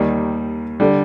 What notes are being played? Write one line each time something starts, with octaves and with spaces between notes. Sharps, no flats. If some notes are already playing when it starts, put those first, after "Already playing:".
Already playing: D#2 D#3 G3
D3 G3